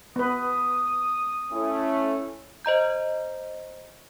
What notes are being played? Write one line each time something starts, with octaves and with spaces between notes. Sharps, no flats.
B3 B4 D#6
A3 C#4 E4
C5 D#5 A#5 G6